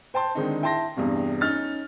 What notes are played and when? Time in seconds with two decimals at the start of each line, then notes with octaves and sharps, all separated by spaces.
0.14 C5 G5 A5 C6
0.35 D3 D#3 G#3 C4 D#4
0.62 E4 G5 A5 C6 A#6
0.96 E2 G2 C3
1.41 C#4 D#4 F6 A6